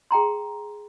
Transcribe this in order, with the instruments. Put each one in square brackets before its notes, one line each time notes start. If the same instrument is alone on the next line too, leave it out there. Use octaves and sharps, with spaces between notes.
[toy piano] G#4 G5 A#5 C6